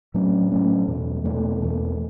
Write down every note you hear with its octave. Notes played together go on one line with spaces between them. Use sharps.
A2 F#3 A3 C#4
A2 F#3 A3 C#4
E2 B2 A3
E2 B2 A3
E2 B2 A3